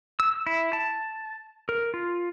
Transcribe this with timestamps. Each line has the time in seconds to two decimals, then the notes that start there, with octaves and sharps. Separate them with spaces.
0.20 E6
0.47 E4
0.73 A5
1.69 A#4
1.94 F4